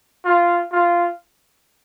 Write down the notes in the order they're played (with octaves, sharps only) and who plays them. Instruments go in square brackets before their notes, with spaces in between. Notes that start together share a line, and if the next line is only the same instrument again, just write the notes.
[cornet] F4
F4